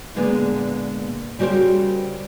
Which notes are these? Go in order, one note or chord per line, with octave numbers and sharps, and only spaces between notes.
A#2 D3 G#3 A#3 B3
C#3 G3 F#4 G4 A#4 C5